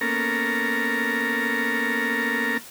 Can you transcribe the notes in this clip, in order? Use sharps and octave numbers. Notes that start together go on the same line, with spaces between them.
A#3 B3 C#4 A4 A#4 A#5